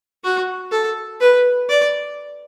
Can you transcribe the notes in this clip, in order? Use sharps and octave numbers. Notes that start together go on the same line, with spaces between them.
F#4
A4
B4
D5